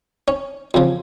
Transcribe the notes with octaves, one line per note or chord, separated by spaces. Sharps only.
C#4
F2 C#3 F3